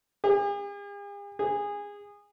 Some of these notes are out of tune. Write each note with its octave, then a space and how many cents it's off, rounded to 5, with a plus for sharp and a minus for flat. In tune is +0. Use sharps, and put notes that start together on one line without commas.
G#4 -45
G#4 -20